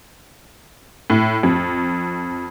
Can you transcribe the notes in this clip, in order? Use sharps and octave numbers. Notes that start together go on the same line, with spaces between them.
A2
F2